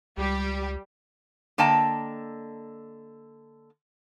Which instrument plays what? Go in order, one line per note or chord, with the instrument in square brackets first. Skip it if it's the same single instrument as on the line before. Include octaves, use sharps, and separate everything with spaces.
[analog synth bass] C#2 [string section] G3 G4
[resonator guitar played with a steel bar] D3 A#3 D#5 G5 A5 A#5